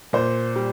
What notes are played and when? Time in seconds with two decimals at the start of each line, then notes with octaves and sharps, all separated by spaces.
0.13 A#2 C5
0.56 G3